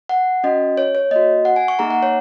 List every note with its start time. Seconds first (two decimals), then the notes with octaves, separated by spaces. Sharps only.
0.09 F#5
0.44 C#4 F#4 D#5
0.78 C#5
0.95 C#5
1.11 A#3 F#4 D#5
1.45 F#5
1.56 G#5
1.68 C#6
1.79 A#3 D#4 G#4 A#5
1.90 F#5
2.03 C#5